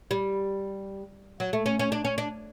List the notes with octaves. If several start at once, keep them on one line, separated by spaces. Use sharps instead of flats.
G3
F#3
A3
C#4
C#4
D4
C#4
D4